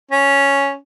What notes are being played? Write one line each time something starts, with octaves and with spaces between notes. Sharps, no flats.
C#4